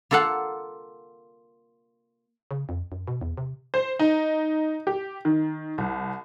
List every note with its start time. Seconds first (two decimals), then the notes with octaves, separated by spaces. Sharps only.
0.11 A#3 F4 A4 F5 F#5
2.51 C#3
2.69 F2
2.92 F#2
3.08 B2
3.21 E2
3.37 C3
3.74 C5
3.99 D#4
4.87 G4
5.25 D#3
5.78 C2